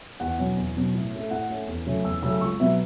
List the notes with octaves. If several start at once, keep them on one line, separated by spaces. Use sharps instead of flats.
E2 F#5
B2 F#3 C#4
E2
B2 F#3 C#4
A2
A3 C#4
A2 F#5
A3 C#4
E2
C#3 F#3 A3 C#4
E2 E6
C#3 F#3 A3 C#4 E6
E6
C#2 C#6
B2 F#3 B3 E5